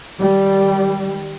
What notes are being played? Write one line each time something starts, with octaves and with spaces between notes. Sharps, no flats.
D#3 G3